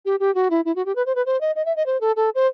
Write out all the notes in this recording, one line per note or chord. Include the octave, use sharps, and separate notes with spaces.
G4
G4
F#4
E4
E4
F#4
G4
B4
C5
B4
C5
D#5
D#5
E5
D#5
C5
A4
A4
C5